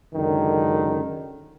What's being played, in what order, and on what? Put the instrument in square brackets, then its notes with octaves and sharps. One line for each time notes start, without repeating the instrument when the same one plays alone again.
[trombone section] C#2 F#2 D3 D#3